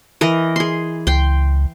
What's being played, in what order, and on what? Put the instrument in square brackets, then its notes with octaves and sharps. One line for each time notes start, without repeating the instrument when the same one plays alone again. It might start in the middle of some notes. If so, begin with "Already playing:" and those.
[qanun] E3 A#4 D#5
G#4 C6
[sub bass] C#2 [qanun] G5 C6